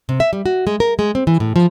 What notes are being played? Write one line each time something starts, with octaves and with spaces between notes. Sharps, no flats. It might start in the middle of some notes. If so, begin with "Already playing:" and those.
C3
E5
G3
F#4
G#3
A#4
G#3
C4
E3
A2
F3